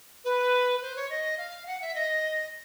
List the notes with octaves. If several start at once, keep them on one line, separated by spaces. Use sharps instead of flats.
B4
C5
C#5
D#5
F5
F#5
E5
D#5